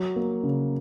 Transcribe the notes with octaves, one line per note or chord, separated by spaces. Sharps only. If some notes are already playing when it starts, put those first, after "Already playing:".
Already playing: F#3
A#3
C#3